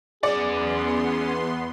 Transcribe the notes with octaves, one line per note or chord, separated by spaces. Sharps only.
E2 B3 C#4 G#4 D5 F#5 C6